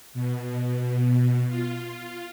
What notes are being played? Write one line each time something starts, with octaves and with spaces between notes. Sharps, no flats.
B2
F4